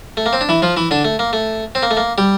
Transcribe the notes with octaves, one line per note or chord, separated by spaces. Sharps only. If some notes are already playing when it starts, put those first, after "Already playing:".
A3
A#3
C4
D4
E3 E4
F3 F4
E3 E4
D3 D4
A3
A#3
A3
C4
A#3
A3
A#3
G3 G4